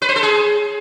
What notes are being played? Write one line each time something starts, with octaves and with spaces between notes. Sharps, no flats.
B4
C5
A4
G#4